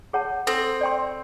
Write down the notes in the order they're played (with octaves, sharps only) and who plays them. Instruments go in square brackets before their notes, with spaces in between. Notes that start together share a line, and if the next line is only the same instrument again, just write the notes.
[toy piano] G#4 C#5 F#5 A5
[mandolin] C4 [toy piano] A4
[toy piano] D5 G5 C6